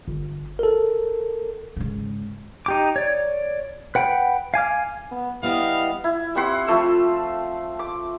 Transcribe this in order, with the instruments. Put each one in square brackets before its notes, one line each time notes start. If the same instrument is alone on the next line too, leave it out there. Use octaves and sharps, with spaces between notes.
[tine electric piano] G1
A4 A#4
[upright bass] G#2 C#3
[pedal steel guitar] D#4 G4 D6
C#5 D5
B4 F#5 G5 B5
F5 G#5 D6 F6
[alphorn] B3
[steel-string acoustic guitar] G3 B3 D#5 [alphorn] E4 [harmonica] F5
[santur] E4
G3 C4 F#5 C6
F3 A3 E6
D6